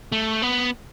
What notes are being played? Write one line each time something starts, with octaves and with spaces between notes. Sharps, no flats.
A3
B3